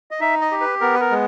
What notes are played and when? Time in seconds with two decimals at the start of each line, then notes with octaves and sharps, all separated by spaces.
0.11 D#5
0.20 D#4 E5
0.41 D#5
0.51 G4
0.61 B4
0.81 B3 A#4
0.94 B4
1.00 A#4
1.11 G#3